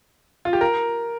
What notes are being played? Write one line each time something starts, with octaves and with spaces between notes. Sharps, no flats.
F4
G4
A#4